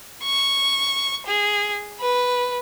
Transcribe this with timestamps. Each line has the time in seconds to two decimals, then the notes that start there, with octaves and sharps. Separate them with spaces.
0.23 C#6
1.27 G#4
2.00 B4